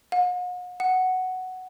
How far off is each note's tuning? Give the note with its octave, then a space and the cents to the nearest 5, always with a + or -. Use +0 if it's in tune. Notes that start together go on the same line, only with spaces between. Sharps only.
F#5 -45
F#5 +5